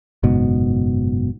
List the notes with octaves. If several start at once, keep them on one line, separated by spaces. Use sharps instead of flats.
F#1 G#2 B2